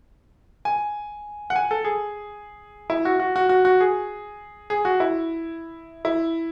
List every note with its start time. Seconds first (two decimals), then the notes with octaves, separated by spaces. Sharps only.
0.65 G#5
1.50 F#5
1.56 G#5
1.71 A4
1.85 G#4
2.90 E4
3.05 F#4
3.19 F#4
3.36 F#4
3.49 F#4
3.65 F#4
3.81 G#4
4.70 G#4
4.85 F#4
5.00 E4
6.05 E4